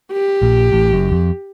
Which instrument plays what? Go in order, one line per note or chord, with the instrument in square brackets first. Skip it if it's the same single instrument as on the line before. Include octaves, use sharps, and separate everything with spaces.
[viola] G4
[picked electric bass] A#1 A#2
A1 A2
F#1 F#2
F2